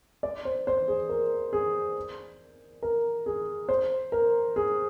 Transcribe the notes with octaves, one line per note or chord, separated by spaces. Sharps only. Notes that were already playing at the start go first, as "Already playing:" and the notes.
D5
C5
C5
G#4
A#4
G#4
A#4
G#4
C5
A#4
G#4